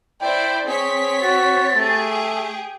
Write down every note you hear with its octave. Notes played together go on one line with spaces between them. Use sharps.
E4 C5 D5 G5
C4 G#4 C#5 B6
F#4 A6
A3 G4 G#4
G5